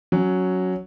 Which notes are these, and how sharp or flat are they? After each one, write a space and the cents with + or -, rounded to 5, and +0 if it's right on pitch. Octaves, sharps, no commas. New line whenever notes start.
F#3 +0 C#4 +0